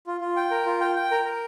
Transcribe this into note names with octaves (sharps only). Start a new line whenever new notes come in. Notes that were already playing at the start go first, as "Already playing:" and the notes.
F4
F4
G5
A#4
F4
G5
G5
A#4
A#4